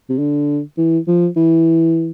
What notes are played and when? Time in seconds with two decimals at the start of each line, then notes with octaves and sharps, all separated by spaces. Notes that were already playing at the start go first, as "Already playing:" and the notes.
0.09 C3
0.19 D3
0.78 E3
1.07 F3
1.36 E3